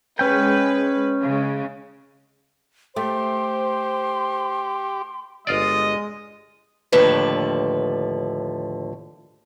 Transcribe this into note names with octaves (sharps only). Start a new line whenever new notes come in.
G#3 C#4 B4 G5
C#3 G#3
A3 G4 C5 C6
G1 G#3 F4 D5 D#5
D#2 A2 D3 F3 B4